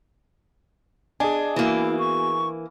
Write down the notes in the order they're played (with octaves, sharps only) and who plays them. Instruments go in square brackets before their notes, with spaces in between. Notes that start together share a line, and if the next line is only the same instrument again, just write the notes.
[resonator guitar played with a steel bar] D4 [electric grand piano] G#4 G#5 [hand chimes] D#5
[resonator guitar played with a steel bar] E3 A#3 [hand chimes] B3 F#4 [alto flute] E4
[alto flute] C#6